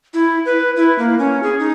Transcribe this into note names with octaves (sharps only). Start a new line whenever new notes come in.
E4
B4
E4
A#3
C#4
G#4
D#4